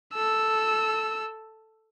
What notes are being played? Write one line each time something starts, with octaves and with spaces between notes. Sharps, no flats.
A4 E6